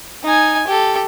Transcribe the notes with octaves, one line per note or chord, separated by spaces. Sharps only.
D#4 G#5
G4 A4